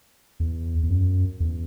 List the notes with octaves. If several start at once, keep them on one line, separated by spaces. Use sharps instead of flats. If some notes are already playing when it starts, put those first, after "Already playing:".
E2
E2
F#2
E2